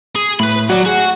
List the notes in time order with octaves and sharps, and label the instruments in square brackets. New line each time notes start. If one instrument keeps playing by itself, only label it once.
[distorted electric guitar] G#4
[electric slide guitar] A2 [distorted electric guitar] B4 B5
[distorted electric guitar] F#3 [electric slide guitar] F#4 D5
[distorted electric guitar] F#4 [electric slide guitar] G#4